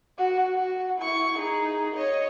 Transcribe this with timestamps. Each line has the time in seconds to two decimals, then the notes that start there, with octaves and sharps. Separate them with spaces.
0.19 F#4
0.55 F#4
0.99 E4 C#6
1.38 D#4 G#4
1.95 C#5 D#5